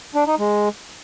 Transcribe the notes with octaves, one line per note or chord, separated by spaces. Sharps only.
D4
D#4
G#3